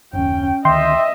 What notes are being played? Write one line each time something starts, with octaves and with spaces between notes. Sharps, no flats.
F#1 D#2 C#4 G5
D2 D#3 D#5 E5 G5 C6